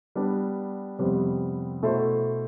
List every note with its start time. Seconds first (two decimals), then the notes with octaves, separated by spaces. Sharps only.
0.15 G3 B3 D4
0.99 F2 C3 G3 B3
1.83 B2 A3 E4 A4 C5